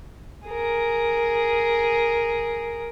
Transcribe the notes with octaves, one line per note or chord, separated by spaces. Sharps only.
G#4 A#4